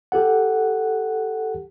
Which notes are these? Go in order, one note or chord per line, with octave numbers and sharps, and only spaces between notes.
G4 A4 F#5